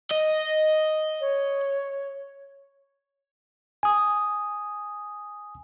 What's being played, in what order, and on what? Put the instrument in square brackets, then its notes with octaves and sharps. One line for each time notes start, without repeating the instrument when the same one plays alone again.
[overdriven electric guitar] D#5
[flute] C#5
[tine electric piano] G#5 D#6